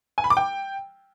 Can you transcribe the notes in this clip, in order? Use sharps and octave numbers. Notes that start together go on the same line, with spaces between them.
G#5
B5
D6
G5